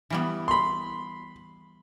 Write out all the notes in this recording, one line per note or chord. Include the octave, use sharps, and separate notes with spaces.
E3 G3 B3
B5 C6